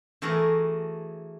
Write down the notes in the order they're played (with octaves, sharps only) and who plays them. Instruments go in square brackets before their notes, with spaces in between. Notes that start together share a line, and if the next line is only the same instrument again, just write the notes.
[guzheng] E3 A3 F#4 G#4 A#4 A#5